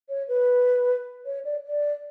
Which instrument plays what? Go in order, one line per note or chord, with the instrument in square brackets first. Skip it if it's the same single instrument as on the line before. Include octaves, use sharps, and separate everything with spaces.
[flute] C#5
B4
C#5
D5
D5